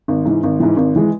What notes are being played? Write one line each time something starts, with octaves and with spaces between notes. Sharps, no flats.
G#1
G#2 E3
G#1
G#2 E3
G#1
E3 G#3